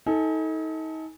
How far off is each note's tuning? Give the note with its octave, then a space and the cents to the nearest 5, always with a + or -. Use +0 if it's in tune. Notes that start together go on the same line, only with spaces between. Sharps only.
D#4 +35 A4 +0 G#5 +0